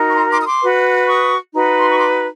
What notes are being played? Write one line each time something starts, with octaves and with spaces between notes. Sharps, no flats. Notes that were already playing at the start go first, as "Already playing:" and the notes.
Already playing: D#4 F#4 A#4
C#6
A#5 C6
C6 D6
D#6
C6 D6
F#4 B4
C#6 D#6
D#4 F#4 B4
C6
C#6
C6 D6